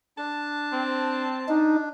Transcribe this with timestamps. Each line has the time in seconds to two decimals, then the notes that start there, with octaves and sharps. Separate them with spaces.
0.18 D4 A5
0.73 C4
1.49 D4 D#4